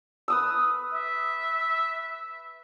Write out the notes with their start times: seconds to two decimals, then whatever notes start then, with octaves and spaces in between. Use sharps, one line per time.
0.28 B4 D#6 E6
0.94 E5